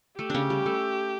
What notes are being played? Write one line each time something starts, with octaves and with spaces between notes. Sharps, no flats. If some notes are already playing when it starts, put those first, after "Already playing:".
A3 G4
C#3 C#4 D4
G3
A3